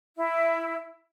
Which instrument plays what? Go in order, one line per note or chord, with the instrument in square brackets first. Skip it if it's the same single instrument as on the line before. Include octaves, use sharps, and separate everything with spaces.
[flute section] E4